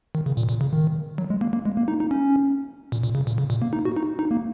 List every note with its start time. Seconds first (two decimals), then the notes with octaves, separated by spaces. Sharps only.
0.15 D#3
0.26 C#3
0.37 A#2
0.49 A#2
0.61 C#3
0.73 D#3
1.18 F#3
1.30 G#3
1.41 A#3
1.53 A#3
1.65 G#3
1.77 A#3
1.88 D#4
2.00 D#4
2.11 C#4
2.92 A#2
3.03 A#2
3.15 C#3
3.27 A#2
3.38 C#3
3.50 A#2
3.62 A#3
3.73 D#4
3.85 F#4
3.97 D#4
4.19 D#4
4.31 A#3